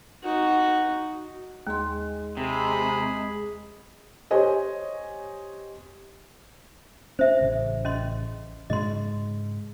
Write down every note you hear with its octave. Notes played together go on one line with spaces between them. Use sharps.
D#4 F#4
D#2 G#3 C6
C3 G#4 B5
G4 C5 C#5 D#5 G#5
C#4 C5 E5
A1 C#3
C#4 D#5 C6
G#2 C#3 G#3 D#5 C6